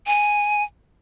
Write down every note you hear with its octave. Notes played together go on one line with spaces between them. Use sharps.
G#5